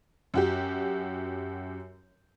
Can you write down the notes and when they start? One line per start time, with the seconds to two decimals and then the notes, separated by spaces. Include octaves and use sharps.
0.34 F#2 F#4 G4